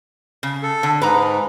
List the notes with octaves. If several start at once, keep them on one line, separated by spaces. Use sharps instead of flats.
C#3
A4
D3
G#2 B4 A#5